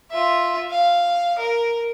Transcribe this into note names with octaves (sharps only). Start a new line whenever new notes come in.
F4 E5
F5
A#4